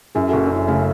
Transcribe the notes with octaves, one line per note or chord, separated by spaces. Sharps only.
F#2 E4 G#4
F#1 F#4 A4
D4
F#1 C#4 E4
C#3 A3 C#4